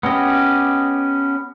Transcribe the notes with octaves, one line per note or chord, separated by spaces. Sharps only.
B3 C#4 G4 D#5